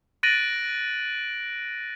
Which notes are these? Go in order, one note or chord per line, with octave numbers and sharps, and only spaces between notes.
F#6 A6 A#6 D7 D#7 F#7